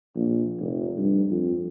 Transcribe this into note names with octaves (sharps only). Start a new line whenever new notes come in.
A#1
F1
G2
F2